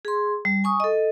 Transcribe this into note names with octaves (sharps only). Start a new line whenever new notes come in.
G#4 C6
G3
G#5 C#6 D#6
A4 D#5